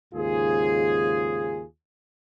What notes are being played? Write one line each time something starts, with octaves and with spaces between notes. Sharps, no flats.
D#2 G#2 C#3 F4 G#4